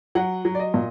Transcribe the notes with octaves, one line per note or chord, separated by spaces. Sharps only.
F#3 F#5
F#3
D5
D#5
A#2